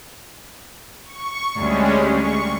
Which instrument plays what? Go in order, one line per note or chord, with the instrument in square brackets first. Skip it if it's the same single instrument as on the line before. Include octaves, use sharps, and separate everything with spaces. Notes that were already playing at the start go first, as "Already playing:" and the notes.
[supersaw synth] C#6
[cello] D2 [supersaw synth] G3 G#3 C#4
[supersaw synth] C#6